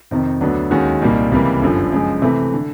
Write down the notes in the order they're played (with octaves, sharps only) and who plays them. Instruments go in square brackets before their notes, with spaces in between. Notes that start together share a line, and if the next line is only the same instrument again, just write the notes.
[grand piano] F2 C3 D#3
D2 D3 F#3 B3 D4
D#2 D#3 G#3 C#4 F#4
C2 A#2 G3 A#3 D#4
C#2 C3 E3 G3 A#3
G1 F#2 D3 F3
F#2 C#3 F3 G#3
C3 E3 A3
D3